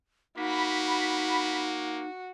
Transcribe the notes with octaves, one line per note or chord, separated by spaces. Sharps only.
A#3 D#4 F#4 B5 B6